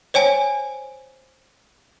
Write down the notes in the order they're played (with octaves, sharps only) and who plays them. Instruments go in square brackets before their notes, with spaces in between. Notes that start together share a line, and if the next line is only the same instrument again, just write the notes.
[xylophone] C5 C#5 G5 G#5